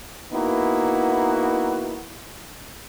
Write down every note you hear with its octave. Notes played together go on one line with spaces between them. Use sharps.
A#3 B3 D#4 E4 F#4